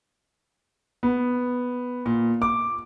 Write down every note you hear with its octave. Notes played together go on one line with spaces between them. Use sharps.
B3
A#2
D6